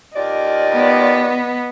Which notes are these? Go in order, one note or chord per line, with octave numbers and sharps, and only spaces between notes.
D#2 F4 D5 D#5
B3